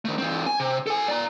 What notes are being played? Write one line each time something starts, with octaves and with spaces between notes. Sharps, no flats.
D#3 A3
E3 C4
G#5
C3
A4 G#5
D5 A#5